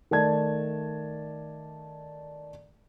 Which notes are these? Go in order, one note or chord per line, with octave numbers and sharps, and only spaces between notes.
D#3 A3 D5 A5 G#6